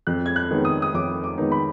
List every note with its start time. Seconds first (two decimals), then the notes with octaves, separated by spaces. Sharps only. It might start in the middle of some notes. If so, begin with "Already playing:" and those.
0.07 F2 F#6
0.26 G#6
0.36 F#6
0.51 D#3 G#3 B3 D#4
0.65 D#6
0.82 D#6
0.94 F2 D6
1.24 D6
1.38 D#3 G#3 B3 D#4
1.52 B5